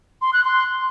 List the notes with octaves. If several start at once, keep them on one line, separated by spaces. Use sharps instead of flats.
C6
F#6
C6